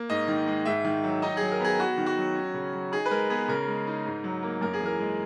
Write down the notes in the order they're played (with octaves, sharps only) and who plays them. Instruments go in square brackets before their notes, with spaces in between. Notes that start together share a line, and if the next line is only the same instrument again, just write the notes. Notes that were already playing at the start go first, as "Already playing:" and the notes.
Already playing: [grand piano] A#3
G#2 D#5
D#3
G#3
G#2 E5
D#3
F#3
D#4 D#5
F#3 G#4
A#4
B3 G#4
B3 F#4
D#3
F#4
F#3
C#4
C#3
F#3
D#4 G#4
B4
G#3 A#4
B3 G#4
C#3 A#4
G#3
D#4
G#2
F#3
A#3
F#2 A#4
G#4
E3 A#4
G#3